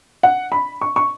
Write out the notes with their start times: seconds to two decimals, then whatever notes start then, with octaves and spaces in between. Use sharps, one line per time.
0.23 F#5
0.52 B5
0.81 C#6
0.96 C#6